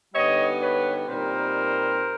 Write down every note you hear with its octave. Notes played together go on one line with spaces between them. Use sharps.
D3 G3 B3 D#4 C#5 D#5
B4 C#5
A#2 G3 C4 D#4 A#4 C5